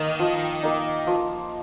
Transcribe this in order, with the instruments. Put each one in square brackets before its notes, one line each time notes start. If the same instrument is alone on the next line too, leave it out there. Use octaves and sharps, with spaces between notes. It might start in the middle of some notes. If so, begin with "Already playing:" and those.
Already playing: [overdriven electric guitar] D#3 [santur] A#3 D#4
[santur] F3
A#3 D#4
F3